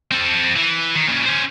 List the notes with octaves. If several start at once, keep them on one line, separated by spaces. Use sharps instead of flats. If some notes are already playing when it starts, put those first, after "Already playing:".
C4 A4
E3
D#3
A#2 C#3
C#4 C5